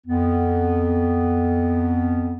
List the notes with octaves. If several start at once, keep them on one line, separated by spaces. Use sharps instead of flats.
F2 B3